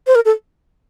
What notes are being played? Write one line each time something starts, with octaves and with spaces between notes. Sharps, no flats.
C5
A#4
A4